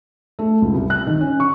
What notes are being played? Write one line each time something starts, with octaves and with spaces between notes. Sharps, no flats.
A3
C#2
C2
F#6
D#3
C#4
C#6